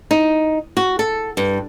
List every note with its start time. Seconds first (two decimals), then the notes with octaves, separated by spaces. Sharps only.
0.11 D#4
0.77 F#4
0.99 A4
1.37 G2